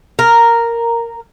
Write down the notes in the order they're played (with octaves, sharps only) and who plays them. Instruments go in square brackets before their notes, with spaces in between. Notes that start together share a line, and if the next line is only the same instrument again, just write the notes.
[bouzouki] A#4